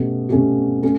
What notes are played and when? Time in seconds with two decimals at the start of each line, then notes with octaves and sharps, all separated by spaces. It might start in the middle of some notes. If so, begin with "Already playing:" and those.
Already playing: B2 A3 C#4 G4
0.29 B2 A3 C#4 G4
0.83 A3 C#4